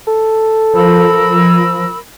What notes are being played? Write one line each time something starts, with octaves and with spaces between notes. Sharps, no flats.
A4
F3 A#4 B5 E6